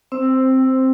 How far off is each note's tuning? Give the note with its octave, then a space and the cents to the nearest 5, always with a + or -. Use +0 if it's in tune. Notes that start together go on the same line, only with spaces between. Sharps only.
C4 +0 C5 +0 E6 +0